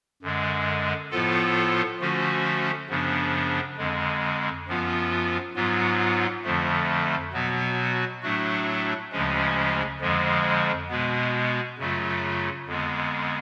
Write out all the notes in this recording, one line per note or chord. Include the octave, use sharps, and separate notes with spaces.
F#2 D3 G#3
A2 F3 B3 F4 A4
D3 F3 A3 C#4 F#4
F#2 C#3 F3 B3 D4
F2 D3 G#3
F#2 F3 B3 F4
G#2 F#3 B3 F4
F2 D3 F3 A3
B2 F#3 B3 F#4
A2 F#3 A3 D4 F#4
D2 C#3 F3 G#3 C#4
F2 D3 F3 G#3
B2 G#3 B3
F#2 C#3 F#3 A3 F4
F2 D3 G#3 B3